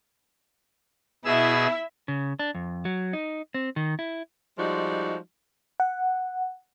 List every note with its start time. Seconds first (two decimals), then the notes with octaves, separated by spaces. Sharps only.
1.25 B2 E4 G#4 E5 E6
2.08 C#3
2.39 D4
2.55 F2
2.85 F#3
3.13 D#4
3.54 C4
3.76 D#3
3.99 E4
4.58 F3 G3 G#3 D#4 F#4
5.80 F#5